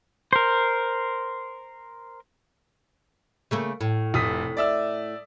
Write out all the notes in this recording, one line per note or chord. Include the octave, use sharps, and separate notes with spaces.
A#4 C5
C#3 A3 A#3
A2
F1 D#6 B6
D5 E5 E6